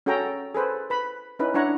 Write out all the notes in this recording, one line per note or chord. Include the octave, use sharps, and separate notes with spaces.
C#4 F#4 G#4 A4 G5 A#5
G#4 A4 B4 C5
B4 B5
C#4 D#4 E4 B4
D4 E4 C#5 F#5 A#5